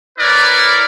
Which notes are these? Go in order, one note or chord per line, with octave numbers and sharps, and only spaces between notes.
E4 A#4 B4 C#5 D5